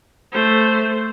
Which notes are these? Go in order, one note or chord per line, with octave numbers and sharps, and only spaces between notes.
A3 C5